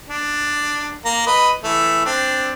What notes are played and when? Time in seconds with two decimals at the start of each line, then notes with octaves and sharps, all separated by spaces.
0.10 D4
1.05 A#3 A#5
1.26 B4 D#5
1.64 E3 A3
2.06 C4 D4